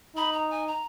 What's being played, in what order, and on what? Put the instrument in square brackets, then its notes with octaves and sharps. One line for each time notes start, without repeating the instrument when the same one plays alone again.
[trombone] D#4 [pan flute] B5
[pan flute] A#5
G#5
A#5